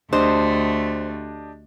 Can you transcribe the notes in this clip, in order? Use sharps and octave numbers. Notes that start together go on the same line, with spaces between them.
D2 A3 D4 G4 C5 D#5